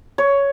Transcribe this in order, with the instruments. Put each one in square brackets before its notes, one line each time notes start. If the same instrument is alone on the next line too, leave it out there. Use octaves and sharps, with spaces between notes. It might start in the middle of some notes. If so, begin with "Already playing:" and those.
[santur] C#5